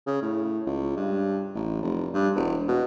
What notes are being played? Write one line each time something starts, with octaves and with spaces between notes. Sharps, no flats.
C#3
A2
C#2
G2
A1
F1
G2
E1
B2